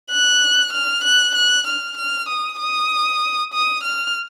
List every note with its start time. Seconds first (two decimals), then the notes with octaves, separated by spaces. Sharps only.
0.11 F#6
0.73 F6
1.04 F#6
1.35 F#6
1.67 F6
1.97 F6
2.29 D#6
2.59 D#6
3.54 D#6
3.84 F6